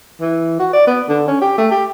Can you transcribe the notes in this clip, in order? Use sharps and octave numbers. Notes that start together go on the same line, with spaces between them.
E3
F#4
D5
B3
D3
C#4
G4
A3
G4